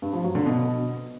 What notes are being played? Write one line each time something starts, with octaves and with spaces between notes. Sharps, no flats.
G2
F3
F#3
D3
B2